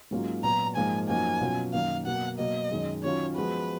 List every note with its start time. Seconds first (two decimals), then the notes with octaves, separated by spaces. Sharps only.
0.11 G#2 F#3 A#3 C#4 F4
0.43 A#2 F#3 B3 F#4 A#5
0.76 G#2 F3 A#3 F4 G#5
1.08 F#2 F3 A#3 D#4 F#4 G#5
1.41 B2 F#3 C#4 F4
1.73 F#2 D#3 A#3 F5
2.06 B2 F#3 A#3 F#5
2.39 B2 F#3 A#3 D#5
2.71 F#2 D#3 G#3
3.03 D#3 F#3 C#4 F4 C#5
3.36 F3 G#3 B3 F#4 B4